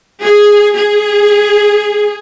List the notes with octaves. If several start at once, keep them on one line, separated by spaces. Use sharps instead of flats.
G#4
G#4